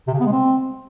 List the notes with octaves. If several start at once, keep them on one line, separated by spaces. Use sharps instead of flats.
C3
C#3
B3
G#3
C4